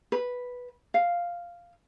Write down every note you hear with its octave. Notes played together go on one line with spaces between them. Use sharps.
B4
F5